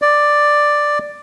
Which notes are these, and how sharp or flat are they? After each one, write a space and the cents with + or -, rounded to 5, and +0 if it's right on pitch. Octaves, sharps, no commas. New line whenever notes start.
D5 +5